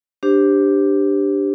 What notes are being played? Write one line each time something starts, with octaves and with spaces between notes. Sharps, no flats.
D4 G4 C5